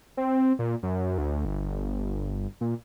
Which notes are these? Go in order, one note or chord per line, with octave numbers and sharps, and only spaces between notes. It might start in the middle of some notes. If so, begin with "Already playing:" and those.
C4
A#2
F#2
D2
G1
A#2